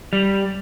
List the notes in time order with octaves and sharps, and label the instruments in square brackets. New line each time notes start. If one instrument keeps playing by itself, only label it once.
[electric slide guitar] G3